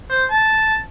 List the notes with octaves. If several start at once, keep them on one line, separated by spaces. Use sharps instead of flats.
C5
A5